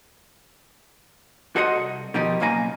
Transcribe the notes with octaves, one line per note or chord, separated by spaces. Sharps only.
F#4 A4 C5 D#5 E5 F#5
C2
B2 D#3 F3 D#4 G4
B1 C#3 A#3 F5 G#5 A#5